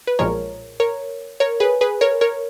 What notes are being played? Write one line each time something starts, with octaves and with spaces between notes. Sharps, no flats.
B4
B1 A#2 F3 G#3 A#4 C#5
A#4 C#5
A#4 C#5
G#4 B4
G#4 B4
A#4 C#5
A#4 C#5